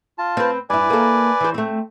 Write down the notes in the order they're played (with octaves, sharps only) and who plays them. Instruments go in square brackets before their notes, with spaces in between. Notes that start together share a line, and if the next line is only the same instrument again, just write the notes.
[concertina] F4 A5
[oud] C4 B4
[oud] G2 E4 [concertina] B4 D5 G#5
[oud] A#3 A4
E3 C5
A3 C4